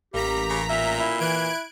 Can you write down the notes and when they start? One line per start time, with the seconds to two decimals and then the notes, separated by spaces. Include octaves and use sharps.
0.14 A1 G3 A#3 G4 A#5 B6
0.50 C#3
0.69 A#2 E5
1.00 E4 E5
1.20 E3 F#6 G#6 D7